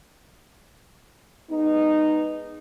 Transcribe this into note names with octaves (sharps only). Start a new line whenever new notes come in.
G#3 B3 D#4